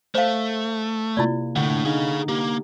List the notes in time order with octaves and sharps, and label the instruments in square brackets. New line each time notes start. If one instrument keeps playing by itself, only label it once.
[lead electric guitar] A3 [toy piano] C5 F5
[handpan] C3 A#3 [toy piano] E4 F4 D5
[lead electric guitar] A2 A3 [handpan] D3 F#5
[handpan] D#4 [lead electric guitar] G#4 F5
[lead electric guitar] A#3 [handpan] G4